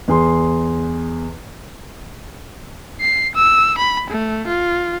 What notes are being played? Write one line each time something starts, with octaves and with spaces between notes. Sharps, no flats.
E2 G#4 C6
C7
E6
B5
A3
F4